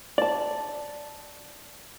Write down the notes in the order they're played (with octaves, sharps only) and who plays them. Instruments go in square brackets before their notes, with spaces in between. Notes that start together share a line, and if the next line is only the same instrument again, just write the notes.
[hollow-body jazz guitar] D5 A5